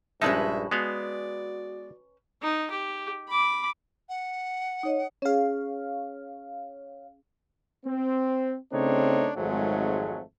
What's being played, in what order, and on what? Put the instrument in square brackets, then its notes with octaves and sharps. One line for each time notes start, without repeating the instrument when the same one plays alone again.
[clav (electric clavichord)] A#1 G#3 D#4 [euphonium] G2 [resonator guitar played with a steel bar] C#4 B4 A5 [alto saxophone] E5
[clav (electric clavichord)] G#3 B3 F5 [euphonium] F#4 [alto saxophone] D5
[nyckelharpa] D#4
G4
B5 D6
[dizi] F#5
[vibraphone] D#4 C#5 D#5
[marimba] C#4 G#4 [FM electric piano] C#5 F5
[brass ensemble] C4
C#3 A3 C4 D4 D#4 C#5
G#1 F2 G#2 F#3 G#3 A3